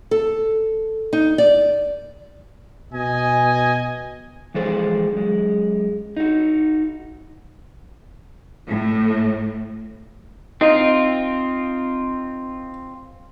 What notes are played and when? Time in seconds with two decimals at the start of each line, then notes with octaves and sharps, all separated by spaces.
0.11 A4
1.13 D#4
1.38 D5
2.93 B2 D#5 G#5
4.54 E3 F3 G#3 A4 C5
5.13 F#2 G#3
6.17 D#4 F#4
8.69 A2
10.61 C4 D#4 F4